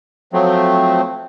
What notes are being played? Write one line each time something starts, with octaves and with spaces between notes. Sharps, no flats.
F3 F#3 A3 C4